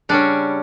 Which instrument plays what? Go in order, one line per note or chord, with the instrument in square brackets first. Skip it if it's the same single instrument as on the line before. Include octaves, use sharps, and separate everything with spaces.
[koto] C#3 G3 C#4 D4